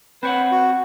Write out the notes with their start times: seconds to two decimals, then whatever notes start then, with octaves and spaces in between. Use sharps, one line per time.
0.23 C4 B4 C#5 F#5
0.51 F#4